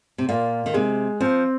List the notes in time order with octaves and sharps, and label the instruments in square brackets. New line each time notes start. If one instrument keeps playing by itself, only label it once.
[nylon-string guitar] C3
[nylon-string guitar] A#2 [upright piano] F4
[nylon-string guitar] D#3
[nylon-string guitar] C3 [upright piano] G#3
[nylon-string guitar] F3 [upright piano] C4